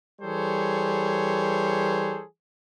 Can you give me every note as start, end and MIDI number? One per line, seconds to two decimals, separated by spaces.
0.21 2.23 52
0.21 2.23 55
0.21 2.23 68
0.21 2.23 69
0.21 2.23 72
0.21 2.23 73